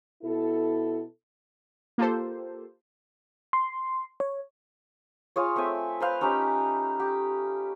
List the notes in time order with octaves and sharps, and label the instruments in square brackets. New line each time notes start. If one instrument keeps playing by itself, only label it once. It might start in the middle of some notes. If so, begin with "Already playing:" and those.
[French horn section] B2 E4 A4
[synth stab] A#3 F4 G4 A4 C5
[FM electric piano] C6
C#5
[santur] F4 G#4 C#5
A3 C4 E5 G#5
B4 C5 F5
C#4 D#4 G4 F5
G4